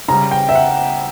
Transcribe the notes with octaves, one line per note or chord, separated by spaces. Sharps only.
C#3 G3 A#5
G5
E5
F#5